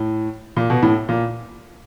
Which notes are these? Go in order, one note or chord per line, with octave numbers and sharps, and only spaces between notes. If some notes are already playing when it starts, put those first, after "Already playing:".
Already playing: A2
A#2
B2
A2
A#2